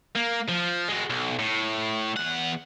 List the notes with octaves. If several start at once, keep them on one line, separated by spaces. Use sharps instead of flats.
A#3
F3
G#3 F#4
B1
A2
E2 F#5